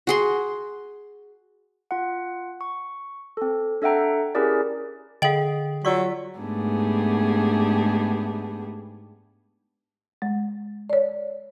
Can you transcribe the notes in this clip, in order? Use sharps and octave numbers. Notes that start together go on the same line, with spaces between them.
F#4 G#4 C6
F4 F#5
C#6
C4 A4
D4 A4 E5 F#5 G5 A#5
C#4 E4 G4 G#4 A#4 D5
D3 G#4 D#5 F5 G5 F#7
F#3 F4 D5 C#6 E6 B6
G#2 A3 B3 D4 G4 G#4
G#3
C#5 D5